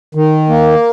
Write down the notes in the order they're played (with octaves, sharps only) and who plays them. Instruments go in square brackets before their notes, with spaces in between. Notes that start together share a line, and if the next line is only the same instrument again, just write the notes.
[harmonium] D#3
A#3